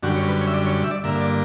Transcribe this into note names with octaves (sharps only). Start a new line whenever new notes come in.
F#2 D3 G3 F#4
C#5
B4
C#5
E5
D5
C#5
E5
D5
G2 D3 A#3 E5
D5